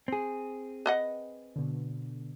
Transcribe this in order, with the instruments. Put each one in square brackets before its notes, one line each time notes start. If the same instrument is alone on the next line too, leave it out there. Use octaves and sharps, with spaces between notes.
[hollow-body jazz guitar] C4 G#4
[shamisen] B4 D#5 F#5
[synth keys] B2 D3